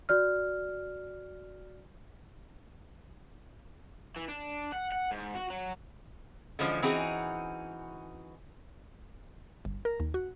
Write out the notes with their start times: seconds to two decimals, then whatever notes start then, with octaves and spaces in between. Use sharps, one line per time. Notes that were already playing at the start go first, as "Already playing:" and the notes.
0.09 F#4 D5 F6
4.16 E3
4.28 D4
4.72 F#5
4.92 F#5
5.11 G#2
5.35 F#4
5.50 F#3
6.59 D3 E3 F3 G#3 C#4 C5
6.82 E3 C4 C#4 D#4 F#4 G#4
9.65 G1
9.85 A#4
10.00 D#2
10.14 F#4